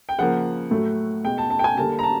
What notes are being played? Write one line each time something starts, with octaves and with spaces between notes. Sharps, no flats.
G5
C#3 F3 A#3 F#5
A2 F#3 A3
B2 G#3 G5
A5
A5
G5
G#5
D3 G3 A#3 A5
A#5
A5